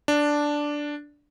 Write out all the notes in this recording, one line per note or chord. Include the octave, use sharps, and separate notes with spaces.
D4